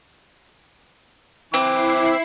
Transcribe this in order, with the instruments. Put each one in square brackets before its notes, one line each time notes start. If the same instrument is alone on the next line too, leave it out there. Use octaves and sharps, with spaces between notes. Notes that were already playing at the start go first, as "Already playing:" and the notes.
[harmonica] E3 D6 [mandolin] C4 [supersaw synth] E4 C7